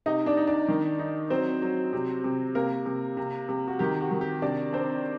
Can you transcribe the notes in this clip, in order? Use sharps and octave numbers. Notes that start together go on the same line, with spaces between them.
C3 D#4 D#5
D4 D5
D#4
D4 D5
D#3
D#4
F#3 C4 C5
F#3
C3
C3
C3 A#3 A#4
C3
C3
C3
F#4
D#3 G4
F#4
D#3
G4
C3 D4 D5
C4 D4 C5